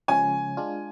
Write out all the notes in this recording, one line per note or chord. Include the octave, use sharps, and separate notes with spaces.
C#3 F3 G#3 C#4 G#5
G#3 D4 F4